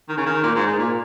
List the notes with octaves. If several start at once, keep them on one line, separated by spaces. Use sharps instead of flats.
D#3
C#3
D#3
A#2
G#2
G#2
A#2